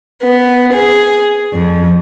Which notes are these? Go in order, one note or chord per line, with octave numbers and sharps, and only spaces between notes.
B3
G#4
F2